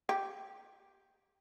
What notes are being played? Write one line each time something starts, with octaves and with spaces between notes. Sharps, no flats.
G4